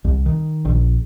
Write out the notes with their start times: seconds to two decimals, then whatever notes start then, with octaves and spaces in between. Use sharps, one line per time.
0.04 C2
0.26 D#3
0.65 A#1